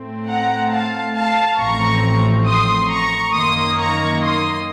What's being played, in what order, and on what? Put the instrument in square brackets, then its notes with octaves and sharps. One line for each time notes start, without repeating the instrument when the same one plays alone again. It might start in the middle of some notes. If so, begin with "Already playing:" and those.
Already playing: [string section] A2 A3 C4
F#5 A#5
F5 A5
F5 A5
A1 A2 F3 C4 A#5 C#6
C6 D#6
A#5 C#6
F#2 D#3 A#3 C6 D#6
A#5 C#6
C6 D#6